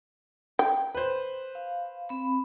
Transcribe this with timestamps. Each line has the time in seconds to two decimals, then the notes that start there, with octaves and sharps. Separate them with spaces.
0.59 G5
0.95 B4 C5
1.55 F5
2.09 C4 B5